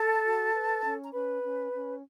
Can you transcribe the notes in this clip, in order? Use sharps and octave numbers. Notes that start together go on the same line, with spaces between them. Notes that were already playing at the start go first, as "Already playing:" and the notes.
Already playing: A4 A5
F#4
B4
C#4
A#5
C#4 B4 B5
C#4
C#4